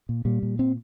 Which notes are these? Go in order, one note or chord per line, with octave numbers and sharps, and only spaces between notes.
A#2
A#2 G3
A#2
C4